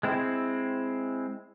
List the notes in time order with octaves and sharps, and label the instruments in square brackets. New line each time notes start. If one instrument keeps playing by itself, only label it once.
[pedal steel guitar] G#3 C4 E4